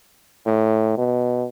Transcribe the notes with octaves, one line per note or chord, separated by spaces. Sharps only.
A2
B2